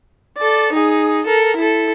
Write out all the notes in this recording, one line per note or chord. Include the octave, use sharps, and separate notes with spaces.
A4 D5
D#4 G#4
A4 A#4
E4 A4